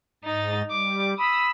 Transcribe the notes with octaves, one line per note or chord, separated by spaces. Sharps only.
G#2 D#4 A6
G3 D6
B5 D#6 E6